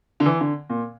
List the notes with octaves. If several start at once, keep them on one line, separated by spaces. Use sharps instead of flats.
D3
E3
D3
A#2